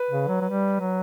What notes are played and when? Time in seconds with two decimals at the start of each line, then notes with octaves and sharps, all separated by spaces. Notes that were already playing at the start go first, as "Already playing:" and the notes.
Already playing: B4
0.11 C#3
0.28 F#3
0.42 F#3
0.45 G3
0.80 F#3